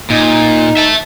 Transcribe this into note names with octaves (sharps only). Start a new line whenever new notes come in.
A#2 D#4
E5 A5